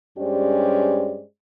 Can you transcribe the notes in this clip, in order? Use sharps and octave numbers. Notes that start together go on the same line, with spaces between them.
G2 G#3 C#4 G4 C5 D5